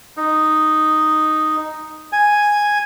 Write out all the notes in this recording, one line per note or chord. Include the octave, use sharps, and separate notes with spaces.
D#4
G#5